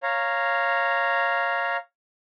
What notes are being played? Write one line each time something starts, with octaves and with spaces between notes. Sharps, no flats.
C#5 F5 A#5